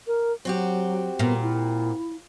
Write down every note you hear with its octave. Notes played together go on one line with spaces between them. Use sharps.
A#4
F#3 C4 F#4 G4
A#2 B3
E4